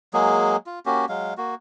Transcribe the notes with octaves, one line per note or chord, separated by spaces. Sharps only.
F#3 G#3 A#3 G#4
F4
A#3 C#4 F#4 G4
F#3 G#3 F5
A#3 F#4